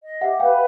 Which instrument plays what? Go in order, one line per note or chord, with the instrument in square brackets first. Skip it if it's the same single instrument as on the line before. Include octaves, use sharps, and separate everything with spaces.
[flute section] D#5
[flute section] G4 [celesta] E5 F#5
[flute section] B4 [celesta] F5 G5